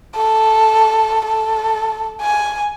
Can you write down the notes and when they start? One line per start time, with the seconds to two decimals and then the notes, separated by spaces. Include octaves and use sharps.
0.16 A4
1.25 A4
2.22 G#5